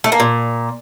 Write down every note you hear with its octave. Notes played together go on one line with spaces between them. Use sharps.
A3
A#3
A#2